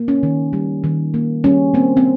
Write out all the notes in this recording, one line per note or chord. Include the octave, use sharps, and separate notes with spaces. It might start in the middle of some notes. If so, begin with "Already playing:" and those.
Already playing: A#3
C#4
D#3
G3
D#3
A#3
G3 C#4
A#3 C4
C4